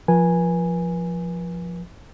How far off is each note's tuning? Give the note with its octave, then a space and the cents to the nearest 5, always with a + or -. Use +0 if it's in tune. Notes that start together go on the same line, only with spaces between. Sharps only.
F3 +0 B4 -40 G#5 -5